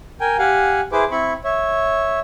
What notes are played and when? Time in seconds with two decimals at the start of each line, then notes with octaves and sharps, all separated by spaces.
0.21 A#4 G5 G#5
0.39 G4 F5 F#5 G#5
0.92 E4 G#4 B4 C5 D6
1.11 C4 E4 B5 C#6
1.44 C#5 E5